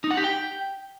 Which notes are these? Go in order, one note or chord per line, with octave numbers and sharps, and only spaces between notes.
D#4
F#5
G4
G5